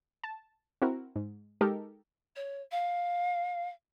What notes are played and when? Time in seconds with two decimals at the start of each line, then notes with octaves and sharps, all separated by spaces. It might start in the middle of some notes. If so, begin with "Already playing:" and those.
0.24 A5
0.82 C4 E4 F#4 A#4
1.16 G#2
1.61 G#3 D#4 G4 A4 A#4
2.36 C#5
2.71 F5